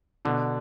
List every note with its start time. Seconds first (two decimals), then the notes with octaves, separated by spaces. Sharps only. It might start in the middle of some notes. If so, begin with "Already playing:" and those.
0.25 B2 D3